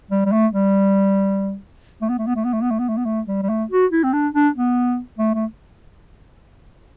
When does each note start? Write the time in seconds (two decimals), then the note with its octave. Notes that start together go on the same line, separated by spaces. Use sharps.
0.11 G3
0.26 G3
0.32 A3
0.53 G3
2.02 A3
2.09 B3
2.18 A3
2.27 B3
2.36 A3
2.44 B3
2.53 A3
2.62 B3
2.71 A3
2.79 B3
2.89 A3
2.97 B3
3.05 A3
3.27 G3
3.43 G3
3.49 A3
3.71 F#4
3.92 E4
4.04 C4
4.13 D4
4.34 D4
4.55 B3
5.19 A3
5.34 A3